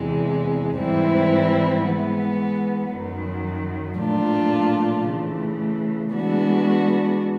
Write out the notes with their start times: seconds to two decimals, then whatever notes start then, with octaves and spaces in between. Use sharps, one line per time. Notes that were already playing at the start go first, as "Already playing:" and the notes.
Already playing: E2 C3 E3 G#3
0.76 G#2 E3 G3 C4 E4
1.84 E3 G#3 B3
2.91 F#2 D#3 F#3
3.99 A#2 F3 A3 D4 F4
5.06 C#3 E3 A3
6.14 E3 G#3 B3 D4 F#4